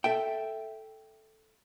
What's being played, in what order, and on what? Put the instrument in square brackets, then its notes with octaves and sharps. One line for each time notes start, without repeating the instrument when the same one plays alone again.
[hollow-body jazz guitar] A4 E5 G5